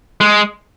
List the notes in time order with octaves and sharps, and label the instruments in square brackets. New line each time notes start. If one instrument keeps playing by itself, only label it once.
[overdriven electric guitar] G#3